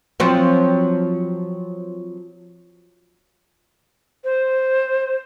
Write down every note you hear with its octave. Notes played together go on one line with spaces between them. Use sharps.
F3 F#3 C4
C5